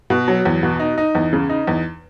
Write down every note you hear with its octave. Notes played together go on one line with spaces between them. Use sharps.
B2
F#3
E2
B2
D#4
D#4
E2
C#3
D#4
E2